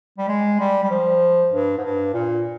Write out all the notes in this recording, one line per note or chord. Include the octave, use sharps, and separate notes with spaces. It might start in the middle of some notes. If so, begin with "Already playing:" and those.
G3
G#3
G3
G3
F3
G2
G#2
G2
A#2